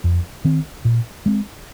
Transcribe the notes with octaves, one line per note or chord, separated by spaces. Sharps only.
F2
D#3 C4
A#2
G#3 C4